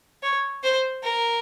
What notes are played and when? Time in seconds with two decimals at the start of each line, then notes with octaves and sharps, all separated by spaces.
0.23 C#5
0.63 C5
1.03 A#4